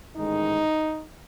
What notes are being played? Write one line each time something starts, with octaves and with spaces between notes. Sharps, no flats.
A1 G#2 D#3 G#3 D#4